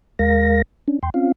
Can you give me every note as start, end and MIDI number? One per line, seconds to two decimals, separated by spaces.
0.19 0.62 39
0.19 0.62 56
0.19 0.62 70
0.19 0.62 77
0.19 0.62 94
0.88 0.99 61
0.88 0.99 62
1.03 1.10 40
1.03 1.10 79
1.03 1.10 84
1.14 1.32 60
1.14 1.32 61
1.14 1.32 65
1.14 1.32 77